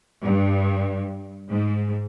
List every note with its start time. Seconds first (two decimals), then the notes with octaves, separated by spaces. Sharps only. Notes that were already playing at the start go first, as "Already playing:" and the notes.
0.23 G2
1.50 G#2